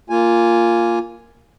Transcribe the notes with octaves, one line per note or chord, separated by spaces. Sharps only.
A#3 F4 G#5